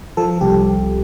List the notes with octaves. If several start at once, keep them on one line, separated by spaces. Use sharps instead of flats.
F3 A4
C2 G4